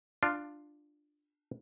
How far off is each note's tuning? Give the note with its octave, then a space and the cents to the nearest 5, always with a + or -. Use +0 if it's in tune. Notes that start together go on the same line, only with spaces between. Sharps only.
D4 +10 F4 +0